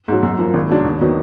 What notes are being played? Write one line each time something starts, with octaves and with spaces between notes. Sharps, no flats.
G#2 F#3
F#2
F3 A#3
G#1
G#2 F#3 D4
D#2
D#3 F#3 B3